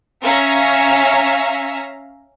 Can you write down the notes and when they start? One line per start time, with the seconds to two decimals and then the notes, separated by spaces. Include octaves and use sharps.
0.23 C#4 E5 F5 A#5